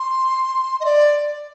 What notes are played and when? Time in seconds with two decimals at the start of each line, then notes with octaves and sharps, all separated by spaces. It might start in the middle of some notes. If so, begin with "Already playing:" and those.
Already playing: C6
0.80 D#5
0.85 D5